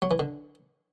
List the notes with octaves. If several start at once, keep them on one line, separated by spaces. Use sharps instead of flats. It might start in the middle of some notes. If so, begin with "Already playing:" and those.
F#3
E3
D3